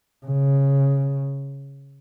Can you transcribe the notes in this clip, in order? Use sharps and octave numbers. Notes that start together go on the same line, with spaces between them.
C#3